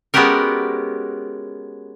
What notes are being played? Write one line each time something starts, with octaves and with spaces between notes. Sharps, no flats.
G#3 B3 C#4 F#4 G4 A#4